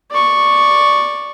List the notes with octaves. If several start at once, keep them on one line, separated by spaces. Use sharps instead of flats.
D5 C#6